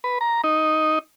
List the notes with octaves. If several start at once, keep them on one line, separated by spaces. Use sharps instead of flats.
B4
A#5
D#4